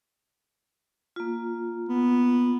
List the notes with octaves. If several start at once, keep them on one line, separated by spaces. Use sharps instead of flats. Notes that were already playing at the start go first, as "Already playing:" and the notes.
A#3 F4
B3